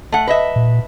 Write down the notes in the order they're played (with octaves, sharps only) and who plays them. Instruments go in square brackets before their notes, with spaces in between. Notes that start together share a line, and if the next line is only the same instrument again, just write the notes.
[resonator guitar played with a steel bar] A3 F#5
B4 D#5 E5
[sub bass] A#2